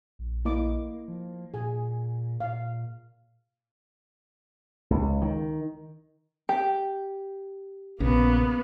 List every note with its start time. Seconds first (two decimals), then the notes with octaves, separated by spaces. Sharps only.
0.19 A#1
0.45 A#3 E4 D#5 D6
1.08 F3
1.54 A#2 G#4 G#5
2.40 A#2 F5
4.91 C#2
5.21 D#3
6.49 G4
8.00 A#1 C#3 A#3 B3